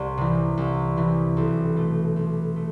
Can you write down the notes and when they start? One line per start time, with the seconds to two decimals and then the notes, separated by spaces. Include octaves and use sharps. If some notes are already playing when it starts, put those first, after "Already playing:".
Already playing: C2
0.18 C3 E3
0.57 C2
0.97 C3 E3
1.37 B1
1.76 B2 A3
2.16 B1
2.56 A3